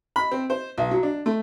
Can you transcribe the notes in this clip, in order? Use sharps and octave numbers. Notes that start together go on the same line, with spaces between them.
B5
C4
C5
B1
F#3
D4
A3